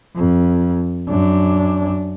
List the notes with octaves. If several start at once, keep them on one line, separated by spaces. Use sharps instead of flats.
F2
F#2 D4